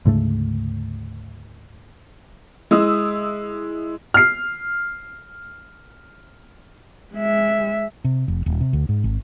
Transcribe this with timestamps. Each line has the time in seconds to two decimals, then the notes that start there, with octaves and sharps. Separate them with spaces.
0.05 D2 G#2 C#3 A3
2.71 G#3 E4 D#6 E6
4.14 F6 C7
7.14 G#3 E5
8.04 C3
8.28 F1
8.46 D#1
8.61 C3
8.73 D2
8.89 G#2
9.04 G#1